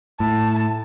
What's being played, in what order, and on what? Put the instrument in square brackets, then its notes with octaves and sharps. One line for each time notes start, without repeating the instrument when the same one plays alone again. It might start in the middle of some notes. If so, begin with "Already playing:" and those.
[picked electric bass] A2 [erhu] A5